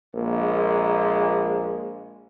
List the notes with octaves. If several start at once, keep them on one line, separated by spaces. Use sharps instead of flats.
A#1 G#3 A#3